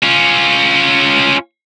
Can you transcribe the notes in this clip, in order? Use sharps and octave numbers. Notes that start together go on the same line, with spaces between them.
C#4 F4